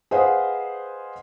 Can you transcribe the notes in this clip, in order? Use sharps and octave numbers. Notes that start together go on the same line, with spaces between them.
G#4 B4 C5 D#5 F5 F#5